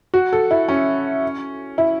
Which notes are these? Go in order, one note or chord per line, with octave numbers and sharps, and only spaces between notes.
F#4
A4
E4
C#4
E4